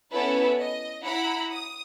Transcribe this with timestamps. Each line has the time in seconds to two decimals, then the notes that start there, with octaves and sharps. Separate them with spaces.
0.11 B3 C#4 E4 A4 B4
0.59 D#5
1.04 E4 F#5 A#5 B5
1.51 D#6